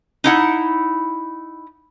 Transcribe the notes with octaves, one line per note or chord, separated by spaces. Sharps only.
D#4 E4 F#5